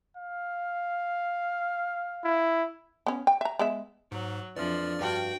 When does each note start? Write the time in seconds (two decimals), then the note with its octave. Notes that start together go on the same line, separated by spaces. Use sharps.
0.17 F5
2.24 E4
3.06 B3 C#4
3.27 G5
3.41 E5 A#5
3.59 G#3 B3 E5
4.12 G#2 F#3
4.56 F2 E3 F3 C4 D4 D5 F6
5.01 G2 F#4 G5